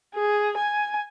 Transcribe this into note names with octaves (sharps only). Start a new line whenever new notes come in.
G#4
G#5